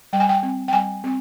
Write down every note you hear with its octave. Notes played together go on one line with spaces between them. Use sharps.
G3 G5
G#5
G5
C4
G5
G3 G#5
C4